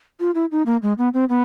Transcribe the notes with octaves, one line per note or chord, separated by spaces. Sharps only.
F4
E4
D#4
A#3
G#3
B3
C4
B3